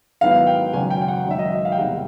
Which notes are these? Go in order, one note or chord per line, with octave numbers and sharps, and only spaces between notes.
G#2 D#3 F#3 B3 E4 F5
G5
G#1 F#2 C#3 G#5
G5
G5
F#5
G#1 F#2 D#3 E5
D#5
E5
F5
G5
E2 C3 D#3 G3 F#5